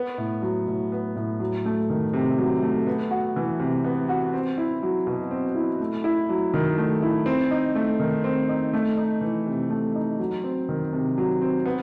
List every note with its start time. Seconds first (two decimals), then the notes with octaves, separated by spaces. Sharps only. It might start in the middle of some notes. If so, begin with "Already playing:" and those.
Already playing: B3
0.18 A2
0.42 F#3
0.67 A2
0.92 B3
1.16 A2
1.40 F#3
1.65 A3
1.90 D#3
2.14 C3
2.38 F#3
2.63 A3
2.86 B3
3.11 F#4
3.36 E3
3.60 C3
3.84 B3
4.09 F#4
4.34 C4
4.58 E4
4.83 F#3
5.07 B2
5.31 C4
5.55 E4
5.80 A3
6.04 E4
6.29 F#3
6.54 D#3
6.77 A3
7.02 E4
7.26 C4
7.51 D#4
7.76 A3
8.00 D#3
8.24 C4
8.49 D#4
8.73 A3
8.97 D#4
9.21 E3
9.46 C3
9.70 A3
9.95 D#4
10.19 F#3
10.44 C4
10.69 D#3
10.93 C3
11.18 F#3
11.42 C4
11.66 B3